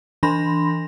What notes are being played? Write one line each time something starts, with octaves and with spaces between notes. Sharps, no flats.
E3 D4 B5 C6 A#6